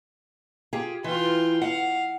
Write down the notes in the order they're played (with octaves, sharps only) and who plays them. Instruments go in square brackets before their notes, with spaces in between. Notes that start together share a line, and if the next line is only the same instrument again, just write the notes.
[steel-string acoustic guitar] F4 G4 G#4
[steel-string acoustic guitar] E3 [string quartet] F4 G5 C6
[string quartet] F5 [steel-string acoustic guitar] F#5